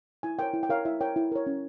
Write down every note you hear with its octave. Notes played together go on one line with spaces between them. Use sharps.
E4 G#5
A#4 C#5 G5
E4
G5
A#4 C#5 F5
E4 E5
A#4 C#5 G5
E4
A#4 C#5
C#4